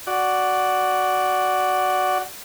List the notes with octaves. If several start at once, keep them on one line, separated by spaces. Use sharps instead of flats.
F#4 D5